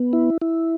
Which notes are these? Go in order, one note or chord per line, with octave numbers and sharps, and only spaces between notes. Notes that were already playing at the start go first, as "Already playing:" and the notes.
Already playing: B3
E4
E4